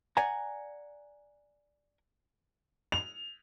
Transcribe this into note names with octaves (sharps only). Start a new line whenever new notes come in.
D5 F#5 G#5 A#5
F7